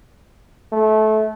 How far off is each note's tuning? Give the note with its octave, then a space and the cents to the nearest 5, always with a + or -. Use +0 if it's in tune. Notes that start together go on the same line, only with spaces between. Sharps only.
A3 -25